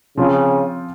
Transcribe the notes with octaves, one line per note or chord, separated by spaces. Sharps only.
C#3 F3 C4 F4